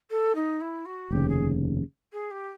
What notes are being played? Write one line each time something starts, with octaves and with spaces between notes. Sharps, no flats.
A4
D#4
E4
F#4
F1 D#2 C#3 G4
G#4
G#4
G4